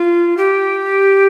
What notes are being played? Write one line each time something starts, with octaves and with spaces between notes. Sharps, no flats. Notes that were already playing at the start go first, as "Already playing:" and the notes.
Already playing: F4
G4